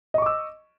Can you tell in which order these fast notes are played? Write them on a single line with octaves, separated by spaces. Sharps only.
D#5 C#6 D6 E6